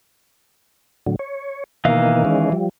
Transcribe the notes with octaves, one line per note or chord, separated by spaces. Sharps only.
A2 D3 F#3
C#5
B2 D#3 E3 A#3 D#5 F5
D#3 G#3 C#4
F3 G3